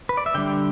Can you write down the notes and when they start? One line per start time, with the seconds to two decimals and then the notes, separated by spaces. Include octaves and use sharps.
0.09 B4
0.17 D5
0.26 E5
0.34 D3 G3 D4 G5